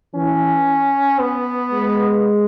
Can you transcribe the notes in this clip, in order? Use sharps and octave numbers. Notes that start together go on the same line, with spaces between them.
E3 C#4
B3
G#3